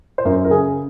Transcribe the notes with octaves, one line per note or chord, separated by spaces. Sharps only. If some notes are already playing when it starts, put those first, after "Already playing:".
C5
F#2 A#4
A#4
C#3 G#4